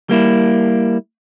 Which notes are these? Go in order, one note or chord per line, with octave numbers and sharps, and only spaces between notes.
G3 A#3 E4